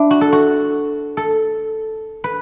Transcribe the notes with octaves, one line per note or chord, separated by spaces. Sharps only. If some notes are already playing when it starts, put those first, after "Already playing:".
Already playing: D4 E4
F#4
A4
F#4
A4
B4